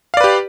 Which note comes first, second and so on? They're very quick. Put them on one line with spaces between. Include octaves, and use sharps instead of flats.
F5 D5 B4 G4